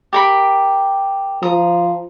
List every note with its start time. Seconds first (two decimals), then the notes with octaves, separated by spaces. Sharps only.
0.13 G4 A#4 B5
1.43 F3 A#5 D#6